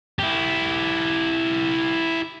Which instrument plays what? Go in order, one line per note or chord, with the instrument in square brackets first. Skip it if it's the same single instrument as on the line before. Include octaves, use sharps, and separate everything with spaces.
[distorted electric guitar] E4 G4